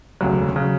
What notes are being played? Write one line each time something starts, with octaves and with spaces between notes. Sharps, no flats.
E1 D2 C#3 F#3
C#3 F#3